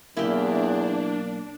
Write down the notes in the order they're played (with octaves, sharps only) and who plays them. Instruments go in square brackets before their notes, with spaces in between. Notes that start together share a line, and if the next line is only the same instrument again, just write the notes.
[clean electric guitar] B1 A#3 [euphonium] E2 [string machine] D4 [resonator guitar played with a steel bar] E4 G4